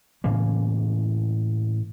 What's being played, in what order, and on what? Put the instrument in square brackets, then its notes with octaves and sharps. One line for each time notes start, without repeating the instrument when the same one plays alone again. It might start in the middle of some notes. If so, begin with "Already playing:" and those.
[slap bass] A2 C#3 E3 A#3